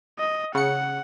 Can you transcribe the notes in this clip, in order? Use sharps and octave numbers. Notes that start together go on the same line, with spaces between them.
D#5
C#3 F#5 C#7